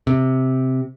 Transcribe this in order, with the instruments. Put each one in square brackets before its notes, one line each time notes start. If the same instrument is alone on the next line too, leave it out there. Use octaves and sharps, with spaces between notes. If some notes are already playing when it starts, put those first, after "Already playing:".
[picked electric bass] C3